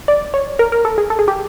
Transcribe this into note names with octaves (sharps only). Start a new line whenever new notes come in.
D5
C#5
A#4
A#4
A4
G#4
A4
G#4
G4